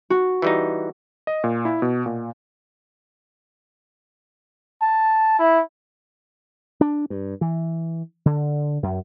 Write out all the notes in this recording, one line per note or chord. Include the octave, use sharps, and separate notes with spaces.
F#4
E3 G3 D#4
D#5
A#2
E4
B2
A#2
A5
E4
D4
G2
E3
D3
F#2